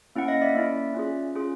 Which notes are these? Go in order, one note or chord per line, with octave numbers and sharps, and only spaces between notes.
A#3 C#4 E4 F#5
D#5 F5
D5 E5
A#3 C#4 E4
C#4 F4 G#4
C#4 F4 G#4